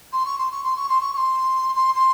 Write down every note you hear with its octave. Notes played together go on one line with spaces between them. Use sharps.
C6
C#6
C6
C#6
C6
C#6
C6
C#6
C#6
C6
C6
C6